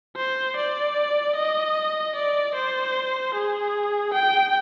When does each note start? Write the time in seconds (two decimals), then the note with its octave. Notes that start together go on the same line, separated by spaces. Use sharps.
0.16 C5
0.56 D5
1.36 D#5
2.16 D5
2.55 C5
3.35 G#4
4.14 G5